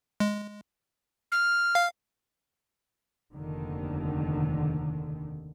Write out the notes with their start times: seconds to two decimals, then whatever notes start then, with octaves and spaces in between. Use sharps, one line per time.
0.20 G#3
1.32 F6
1.75 F5
3.34 F1 D#2 D3 D#3